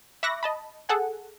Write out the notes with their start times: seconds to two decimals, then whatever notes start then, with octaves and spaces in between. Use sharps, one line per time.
0.23 E5 B5 C#6 D6 F#6 A#6
0.43 D#5 A5 B5
0.89 G#4 A4 F#5 G#5